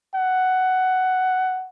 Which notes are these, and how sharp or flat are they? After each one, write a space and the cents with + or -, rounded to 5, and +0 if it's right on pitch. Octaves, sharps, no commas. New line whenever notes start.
F#5 +10